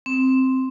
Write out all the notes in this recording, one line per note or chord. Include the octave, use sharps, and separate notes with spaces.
C4